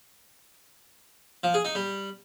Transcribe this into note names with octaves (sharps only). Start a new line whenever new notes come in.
F3
G#4
D#4
G3